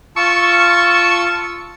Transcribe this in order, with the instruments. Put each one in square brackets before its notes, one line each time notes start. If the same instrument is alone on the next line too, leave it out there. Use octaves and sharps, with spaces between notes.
[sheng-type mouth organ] F4 A5 E6 [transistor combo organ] C#6